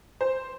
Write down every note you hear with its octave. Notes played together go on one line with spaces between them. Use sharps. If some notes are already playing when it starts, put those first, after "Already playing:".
C5